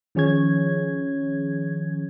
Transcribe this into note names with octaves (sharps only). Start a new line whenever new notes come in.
D#3 F3 C#4 G#4 C#5 G#6